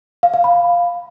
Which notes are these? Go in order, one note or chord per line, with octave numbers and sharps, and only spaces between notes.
F5
F5
B5